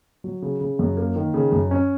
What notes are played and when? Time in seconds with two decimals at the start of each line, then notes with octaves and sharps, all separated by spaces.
0.24 F#3
0.42 C#3
0.61 C#3
0.79 F#2
0.97 A#3
1.16 D#3
1.34 C#3
1.52 F#2
1.71 C#4